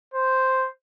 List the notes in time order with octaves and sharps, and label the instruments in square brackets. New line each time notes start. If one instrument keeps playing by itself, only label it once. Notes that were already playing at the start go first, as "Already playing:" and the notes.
[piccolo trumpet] C5